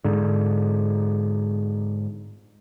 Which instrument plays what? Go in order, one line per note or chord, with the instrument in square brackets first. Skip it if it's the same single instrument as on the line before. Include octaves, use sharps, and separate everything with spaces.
[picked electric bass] G#2 D3